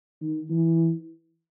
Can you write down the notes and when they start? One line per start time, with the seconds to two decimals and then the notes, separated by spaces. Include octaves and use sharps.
0.22 D#3
0.50 E3